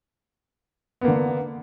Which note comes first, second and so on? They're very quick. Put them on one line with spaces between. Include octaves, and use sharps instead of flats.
B3 A#3 D3